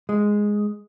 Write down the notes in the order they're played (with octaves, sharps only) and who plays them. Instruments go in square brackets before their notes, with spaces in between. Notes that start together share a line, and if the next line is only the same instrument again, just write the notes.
[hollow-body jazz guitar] G#3